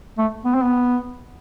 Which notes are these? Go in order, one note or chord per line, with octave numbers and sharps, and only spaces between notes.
A3
B3
C4
B3